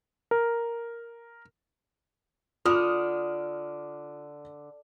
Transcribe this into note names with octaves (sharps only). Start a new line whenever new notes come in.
A#4
D3 F4 D6 D#6 F6